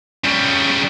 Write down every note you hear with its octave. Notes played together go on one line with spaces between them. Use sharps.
C#3 G3